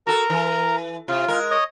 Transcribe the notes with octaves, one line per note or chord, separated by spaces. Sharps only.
F#4 A4 A#4 A#5
E3
C3 F4
G#3 A#4
C#5 D#5 D#6